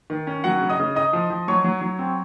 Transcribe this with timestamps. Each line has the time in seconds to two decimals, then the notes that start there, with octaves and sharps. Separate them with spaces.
0.10 D#3
0.27 C#4
0.44 F#3 F#4 F#5
0.61 C#3
0.70 D#5 D#6
0.79 C#3
0.95 D#4 D#5 D#6
1.13 F3
1.30 F3
1.48 F#3 C#5 C#6
1.64 F#3
1.81 F#3
1.99 C4